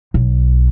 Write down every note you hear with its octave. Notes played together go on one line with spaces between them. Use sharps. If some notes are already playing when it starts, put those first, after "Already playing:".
B1